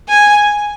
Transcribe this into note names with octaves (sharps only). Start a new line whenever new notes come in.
G#5